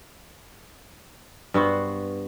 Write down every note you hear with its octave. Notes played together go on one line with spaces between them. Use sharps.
G2 B3 F#4 C5